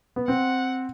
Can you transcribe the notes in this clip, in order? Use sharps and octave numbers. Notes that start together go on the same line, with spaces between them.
B3
C4 F#5